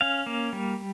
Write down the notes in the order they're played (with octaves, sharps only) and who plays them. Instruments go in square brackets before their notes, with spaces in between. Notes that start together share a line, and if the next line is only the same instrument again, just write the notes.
[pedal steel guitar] C#4 F5
A#3
G3